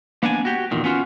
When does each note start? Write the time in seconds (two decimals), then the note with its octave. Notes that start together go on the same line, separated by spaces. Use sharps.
0.23 A#3 B3 D4 D5 E5 G#5
0.45 F#4 G4
0.71 E2 A#2 D#3
0.84 B3 C#4 F4 F#4